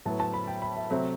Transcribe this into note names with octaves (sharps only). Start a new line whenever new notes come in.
A2 F#3 B3 A5
A5
B5
G5
B5
E5
C3 F#3 A3 C4 E5